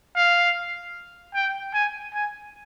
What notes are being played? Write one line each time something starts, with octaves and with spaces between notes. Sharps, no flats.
F5
G5
G#5
G#5